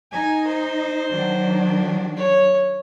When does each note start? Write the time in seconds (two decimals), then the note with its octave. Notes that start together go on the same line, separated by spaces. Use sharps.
0.12 D#4 G#5
0.47 C5
1.11 D#3 F#3 D4
2.17 C#5